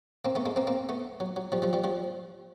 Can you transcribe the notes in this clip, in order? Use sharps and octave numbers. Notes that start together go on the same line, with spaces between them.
A#3 C4
A3 B3
G#3 A#3
A#3 C4
A#3 C4
A3 B3
F#3
F#3
F3 G3
F3 G3
F3 G3
F3 G3